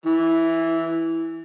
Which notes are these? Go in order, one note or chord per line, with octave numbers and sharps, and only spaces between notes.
E3